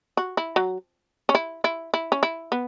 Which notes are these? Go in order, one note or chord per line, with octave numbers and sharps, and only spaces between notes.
F#4
E4
F#3
C#4
E4
E4
E4
C#4
E4
B3